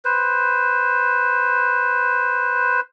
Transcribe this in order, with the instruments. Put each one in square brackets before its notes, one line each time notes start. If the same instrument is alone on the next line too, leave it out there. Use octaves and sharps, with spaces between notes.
[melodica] B4 C5